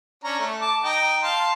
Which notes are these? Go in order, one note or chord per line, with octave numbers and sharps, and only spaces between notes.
C#4 D4 A#5
A3
A5 D6
D#4 G5 A#5
F5 A5 C6